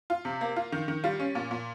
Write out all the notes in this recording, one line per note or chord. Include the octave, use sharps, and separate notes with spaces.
F4
C3
A#3
F4
D#3
D#3
G3 F4
C#4
A#2
A#2